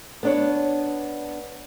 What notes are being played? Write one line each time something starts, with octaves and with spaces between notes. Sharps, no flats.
B3 D4 C#5